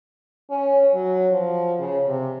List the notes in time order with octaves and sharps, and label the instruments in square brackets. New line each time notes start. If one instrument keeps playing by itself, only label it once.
[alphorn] C#4
F#3
F3
C#3
C3